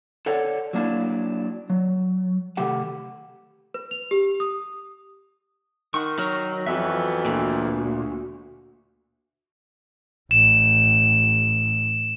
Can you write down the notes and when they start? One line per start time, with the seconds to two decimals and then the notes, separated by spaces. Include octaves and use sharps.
0.26 A4 C#5 D5 F#5
0.73 F#3 A#3 D4 E4
1.70 F#3
2.57 C3 D#3 A3 G4 F#5
3.74 B4
3.91 F7
4.11 G4
4.40 D#6
5.94 D#3 F#5 C#6
6.19 F#3 A#4
6.66 F2 E3 B3 F#4 E5
7.25 D2 A#2
10.31 A1 E7